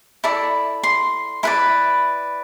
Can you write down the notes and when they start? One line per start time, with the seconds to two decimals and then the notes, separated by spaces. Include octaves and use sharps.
0.24 E4 A4 D5 B5
0.84 C6
1.43 E4 B4 D5 B5